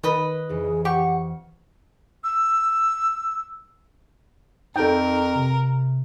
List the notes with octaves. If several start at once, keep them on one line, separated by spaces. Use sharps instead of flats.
D#3 B4 D#5
F2 E3 G#4
G4 F#5 C#6
E6
F2 D#4 A4 A#4 G5
C3